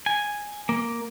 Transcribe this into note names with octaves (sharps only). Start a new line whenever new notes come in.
G#5
A#3